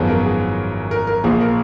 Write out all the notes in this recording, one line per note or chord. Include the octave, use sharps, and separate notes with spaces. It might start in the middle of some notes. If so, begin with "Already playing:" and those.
Already playing: G#1 F#2 F3 B3 G#4
A#4
G#4
A#4
A#4
A#1 A#2 F3 G#4
A#4